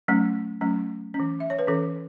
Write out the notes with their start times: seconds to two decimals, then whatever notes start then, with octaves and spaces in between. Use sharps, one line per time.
0.08 F#3 A3 C#4
0.61 F#3 A3 C#4
1.14 C#4
1.20 E3
1.40 E5
1.50 C#5
1.59 B4
1.67 E3 C#4 A4